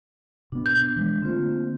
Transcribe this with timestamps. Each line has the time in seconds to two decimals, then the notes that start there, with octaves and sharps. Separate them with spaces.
0.52 B2 B3 D4
0.66 G6
0.96 E3 G#3
1.22 D3 A3 A#3 C4 F4 C5